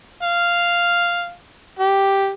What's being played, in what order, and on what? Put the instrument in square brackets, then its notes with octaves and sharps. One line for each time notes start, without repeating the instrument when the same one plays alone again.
[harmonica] F5
G4